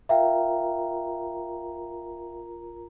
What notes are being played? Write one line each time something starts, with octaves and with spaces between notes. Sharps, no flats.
F4 A#4 E5 F5 G5 A#5